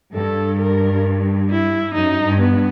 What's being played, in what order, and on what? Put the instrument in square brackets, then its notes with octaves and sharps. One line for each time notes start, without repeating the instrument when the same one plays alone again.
[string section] G2 [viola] A4
[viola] A#4
E4
[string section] F#2 [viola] D#4
[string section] G2
[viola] B3